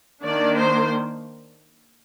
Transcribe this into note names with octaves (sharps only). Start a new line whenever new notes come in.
D#3 A#3 D4 D5
C5